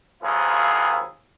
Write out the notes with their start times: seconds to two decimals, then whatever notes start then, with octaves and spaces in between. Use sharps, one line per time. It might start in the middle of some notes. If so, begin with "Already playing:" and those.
0.23 G#1 D#2 F3 E4 F4 G#4